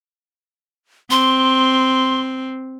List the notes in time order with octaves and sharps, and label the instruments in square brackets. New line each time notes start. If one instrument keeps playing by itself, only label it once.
[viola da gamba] C4 [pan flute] C6